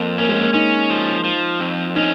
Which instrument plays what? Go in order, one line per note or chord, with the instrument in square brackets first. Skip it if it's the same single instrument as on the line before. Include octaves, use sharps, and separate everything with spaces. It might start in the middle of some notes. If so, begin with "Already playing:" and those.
Already playing: [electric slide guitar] F2 [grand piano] A#3
[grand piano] A#3 [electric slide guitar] C#4
[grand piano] G#3
A#3
[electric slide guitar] C#4 [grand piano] D#4
[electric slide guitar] F3
F3
F2
[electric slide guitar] C#4 [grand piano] D#4